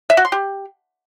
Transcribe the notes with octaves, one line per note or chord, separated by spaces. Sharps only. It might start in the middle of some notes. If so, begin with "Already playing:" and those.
E5
F#4
C6
G4